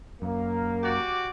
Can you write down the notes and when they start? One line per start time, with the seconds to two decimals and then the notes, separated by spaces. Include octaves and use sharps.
0.22 F#2 A#3
0.83 F#4 G4 D5